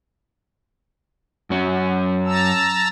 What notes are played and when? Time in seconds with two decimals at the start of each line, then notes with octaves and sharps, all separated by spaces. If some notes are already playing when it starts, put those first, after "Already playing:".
1.50 F#2 C#4
2.25 A5 A#5 E6